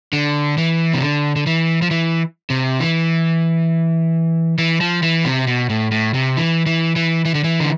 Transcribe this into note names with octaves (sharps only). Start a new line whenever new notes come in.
D3
E3
C3
D3
D3
E3
F3
E3
C3
E3
E3
F3
E3
C3
B2
A2
A2
C3
E3
E3
E3
E3
D3
E3
D3